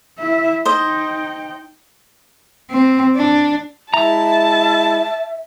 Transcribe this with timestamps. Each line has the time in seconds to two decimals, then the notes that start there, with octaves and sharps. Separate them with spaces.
0.19 E4 E5
0.65 D#4 C5 D#5 G5
2.71 C4
3.16 D4
3.94 G#3 E4 E5 A5 A#5